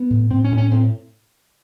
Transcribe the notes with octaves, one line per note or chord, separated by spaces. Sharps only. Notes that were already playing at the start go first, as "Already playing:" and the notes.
Already playing: B3
A2
A2 C4
C#4
A2
C#4
A2 C4